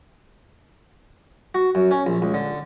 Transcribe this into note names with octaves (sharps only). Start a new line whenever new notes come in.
F#4
F#2
C#4
A#1
C#2
D3